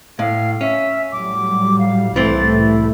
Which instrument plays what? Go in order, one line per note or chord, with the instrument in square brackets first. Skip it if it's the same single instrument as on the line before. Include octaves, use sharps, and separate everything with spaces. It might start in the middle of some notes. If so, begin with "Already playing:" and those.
[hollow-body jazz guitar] A2 [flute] F5
[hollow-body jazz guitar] C#4 [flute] E5
[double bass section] A2 F#3 G3 [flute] D6
[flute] F5
[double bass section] C2 A2 A3 [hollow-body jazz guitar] E3 C4 [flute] A6
[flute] E4